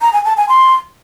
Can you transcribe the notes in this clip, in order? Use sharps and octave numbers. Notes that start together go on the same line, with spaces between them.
A#5
G#5
A5
G#5
C6